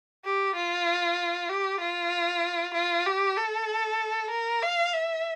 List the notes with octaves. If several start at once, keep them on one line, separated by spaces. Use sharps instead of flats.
G4
F4
G4
F4
F4
G4
A4
A#4
F5
E5